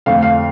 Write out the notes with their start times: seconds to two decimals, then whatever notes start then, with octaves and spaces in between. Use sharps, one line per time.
0.06 F2 D3 A3 C4 F5
0.22 F5